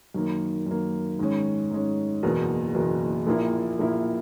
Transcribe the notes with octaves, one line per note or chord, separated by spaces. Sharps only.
F#2 D#3 A#3
F#2 D#3 A#3
G#2 D#3 G#3 C#4
G#2 D#3 G#3 C#4
F#1 E2 B2 A#3
F#1 E2 B2 A#3
A#1 A#2 A#3 E4
A#1 A#2 A#3 E4